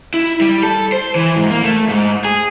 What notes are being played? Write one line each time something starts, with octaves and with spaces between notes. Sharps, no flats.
E4
G3
A4
C5
E3
G#2
A#3
A3
G#2
G#4